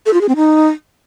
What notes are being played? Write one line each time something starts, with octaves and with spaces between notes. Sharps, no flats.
A4
F4
G#4
C4
D#4